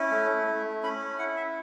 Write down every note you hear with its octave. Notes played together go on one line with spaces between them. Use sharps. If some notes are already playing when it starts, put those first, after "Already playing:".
Already playing: C#4 E4
A3
A3
C#4 B5
E4 F#5
E5